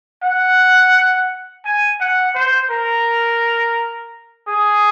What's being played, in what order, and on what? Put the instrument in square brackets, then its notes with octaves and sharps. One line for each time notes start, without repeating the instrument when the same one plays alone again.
[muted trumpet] F#5
G#5
F#5
C5
A#4
G#4